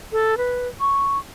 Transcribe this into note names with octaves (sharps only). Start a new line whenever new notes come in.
A4
B4
C#6